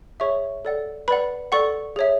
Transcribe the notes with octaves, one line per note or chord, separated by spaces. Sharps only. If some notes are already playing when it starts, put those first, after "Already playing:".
G#4 C#5 E5 C#6
A4 D5 F#5
B4 D5 F#5 B5
A4 D5 F#5 C#6
G#4 C#5 E5